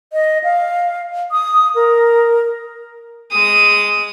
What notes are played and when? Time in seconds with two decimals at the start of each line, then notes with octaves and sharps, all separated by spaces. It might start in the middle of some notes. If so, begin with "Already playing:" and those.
0.13 D#5
0.44 F5
1.32 D#6
1.75 A#4
3.32 G#3 D#6